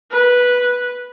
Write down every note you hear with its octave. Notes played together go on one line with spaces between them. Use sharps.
B4